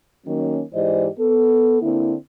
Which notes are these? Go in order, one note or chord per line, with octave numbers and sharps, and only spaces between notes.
D#3 F#3 A#3 C#4
G#2 E3 G4 C5 D5 D#5
B3 A4
D3 A#3 C4 E4